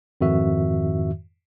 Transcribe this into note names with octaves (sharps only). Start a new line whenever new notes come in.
F2 G#2 D#3 F#4 E5